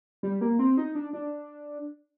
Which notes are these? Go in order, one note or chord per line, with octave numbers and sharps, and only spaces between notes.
G3
A#3
C4
D#4
D4
D4